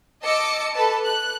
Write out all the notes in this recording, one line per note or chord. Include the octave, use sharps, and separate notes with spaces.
D#5 A5 D6 E6 C#7
A4 B4 A5
F#6